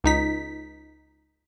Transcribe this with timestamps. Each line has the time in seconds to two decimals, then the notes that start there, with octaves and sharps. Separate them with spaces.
0.04 C#2 D#4 B6